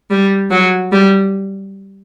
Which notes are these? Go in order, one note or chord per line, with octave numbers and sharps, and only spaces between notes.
G3
F#3
G3